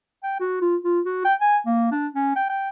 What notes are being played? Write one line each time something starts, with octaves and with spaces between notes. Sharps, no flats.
G5
F#4
F4
F4
F#4
G5
G#5
A#3
D4
C#4
G5
G5